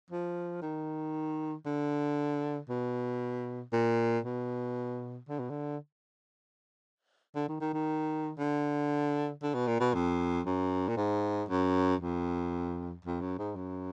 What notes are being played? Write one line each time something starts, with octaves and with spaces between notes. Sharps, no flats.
F3
D#3
D3
B2
A#2
B2
D3
B2
D3
D3
D#3
D#3
D#3
D3
D3
B2
A#2
B2
F2
F#2
A#2
G#2
F#2
F2
F2
F#2
G#2
F#2